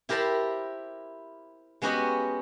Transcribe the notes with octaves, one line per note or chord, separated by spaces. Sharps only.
E4 G4 A#4 C5 A5 B5
G#3 B3 C#4 F#4 G4 D#5